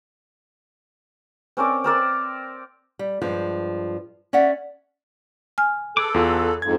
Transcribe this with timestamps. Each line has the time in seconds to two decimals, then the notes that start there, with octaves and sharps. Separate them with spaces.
1.57 C4 C#4 A#4 D5
1.84 C4 A#4 D5
2.99 G3
3.22 G2 F3 G#3
4.33 C#4 D5 E5 F#5
5.58 G#5 F6
5.97 G#4 A4 B4 D6
6.14 E2 F4
6.62 F2 G#2 G#6